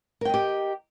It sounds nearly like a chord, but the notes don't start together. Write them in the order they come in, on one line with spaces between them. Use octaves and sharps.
A#4 G5 D#5 G4